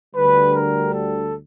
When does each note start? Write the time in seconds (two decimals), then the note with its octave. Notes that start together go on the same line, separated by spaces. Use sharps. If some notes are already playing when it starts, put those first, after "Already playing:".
0.14 D2 D3 G3 B4
0.53 A#4
0.93 A4